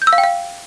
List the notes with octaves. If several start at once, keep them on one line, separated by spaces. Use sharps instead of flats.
G6
E6
F5
G5
F5